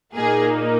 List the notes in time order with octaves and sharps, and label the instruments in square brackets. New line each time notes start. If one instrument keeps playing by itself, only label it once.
[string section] A#2 A#3 D#4 G#4